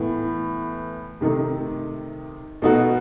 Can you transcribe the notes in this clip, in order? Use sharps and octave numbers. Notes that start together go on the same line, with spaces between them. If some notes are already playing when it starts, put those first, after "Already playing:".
Already playing: A2 E3 B3
C3 D#3 A3 D#4
B2 A3 D#4 F#4